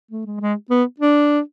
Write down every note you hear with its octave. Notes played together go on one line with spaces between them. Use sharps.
A3
G#3
G#3
B3
D4